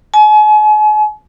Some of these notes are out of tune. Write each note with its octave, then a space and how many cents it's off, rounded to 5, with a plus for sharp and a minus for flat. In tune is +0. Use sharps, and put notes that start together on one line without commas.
G#5 +40